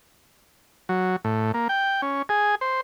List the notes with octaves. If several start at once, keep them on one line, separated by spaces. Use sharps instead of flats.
F#3
A2
A#3
G5
C#4
G#4
C5